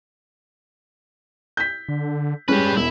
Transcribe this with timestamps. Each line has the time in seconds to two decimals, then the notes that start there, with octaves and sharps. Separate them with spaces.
1.57 G6 B6
1.88 D3
2.48 G3 G#3 C#4 G4 B4
2.77 E1 E4